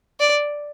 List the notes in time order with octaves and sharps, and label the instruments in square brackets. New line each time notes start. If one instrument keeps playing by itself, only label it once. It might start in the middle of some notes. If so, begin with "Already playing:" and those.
[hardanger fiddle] D5